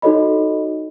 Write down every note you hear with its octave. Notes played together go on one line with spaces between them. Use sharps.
D#4 F#4 A4 C#5 D#5 B5